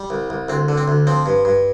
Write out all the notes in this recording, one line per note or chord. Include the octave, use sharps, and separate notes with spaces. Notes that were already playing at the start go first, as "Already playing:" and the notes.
Already playing: G3
C2
C2
D2 C4
D3
C4
D2
F3 C4
G2
G2